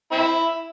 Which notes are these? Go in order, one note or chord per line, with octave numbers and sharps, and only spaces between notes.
C4 E4